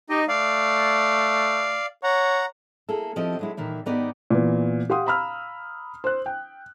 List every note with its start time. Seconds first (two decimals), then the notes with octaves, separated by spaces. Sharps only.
0.10 D#4 G4 D#5
0.28 A3 D5 F5
2.03 C#5 F#5 A#5
2.89 A#3 E4 G#4 A4
3.16 F3 C4 E4 G4 D#5
3.39 F#3 G#3 E4
3.57 A#2 D#3 E3 E4
3.86 G#2 D#3 B3 D#4 G4 D5
4.30 A#2 E3 B3
4.90 G4 F5 F#5 C6 D#6
5.06 F5 A#5 B5 E6 F6
6.04 C5 F#6
6.26 G5